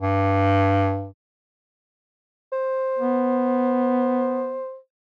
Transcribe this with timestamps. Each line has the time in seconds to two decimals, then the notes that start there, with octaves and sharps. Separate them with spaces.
0.01 G2
2.53 C5
2.99 B3